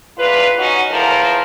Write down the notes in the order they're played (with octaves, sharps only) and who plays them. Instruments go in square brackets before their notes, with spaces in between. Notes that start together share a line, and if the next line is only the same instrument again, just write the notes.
[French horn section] E2 A#2 F4 B4
C#4 D#4 F#4
E2 A2 E3 F3 A#4